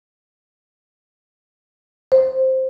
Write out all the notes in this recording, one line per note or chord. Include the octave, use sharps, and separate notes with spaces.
C5